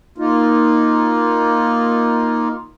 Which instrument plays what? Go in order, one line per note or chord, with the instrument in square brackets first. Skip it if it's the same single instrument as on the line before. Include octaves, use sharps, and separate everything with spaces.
[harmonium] A#3 D#4 F4